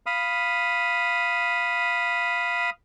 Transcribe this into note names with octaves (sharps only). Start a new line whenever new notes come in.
F5 B5 D#6